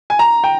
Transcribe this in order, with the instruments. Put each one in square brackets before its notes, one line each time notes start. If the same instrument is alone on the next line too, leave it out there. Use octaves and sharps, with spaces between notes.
[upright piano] G#5
A#5
G5